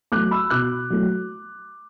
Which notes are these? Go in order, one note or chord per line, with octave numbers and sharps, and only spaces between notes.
F#3 A3 D6 F#6
B5 E6
B2 D6 F#6
F#3 A3